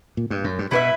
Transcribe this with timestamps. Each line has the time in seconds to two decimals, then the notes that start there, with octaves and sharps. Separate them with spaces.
0.17 A#2
0.30 G2
0.44 F#2
0.59 G2
0.71 B2 E4 B4 E5